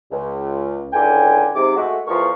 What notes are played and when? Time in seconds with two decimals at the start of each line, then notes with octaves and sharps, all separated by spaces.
0.12 C#2
0.93 C#2 A2 D3 G5 G#5
1.56 G#2 C3 D6
1.76 G#3 A3 F#4
2.07 E2 A2 F3 A#4 C#6